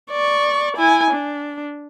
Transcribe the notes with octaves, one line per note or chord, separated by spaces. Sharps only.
D5 C#6
E4 G#5
D4